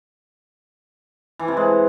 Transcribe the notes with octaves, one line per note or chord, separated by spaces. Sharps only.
E3
C3
G#3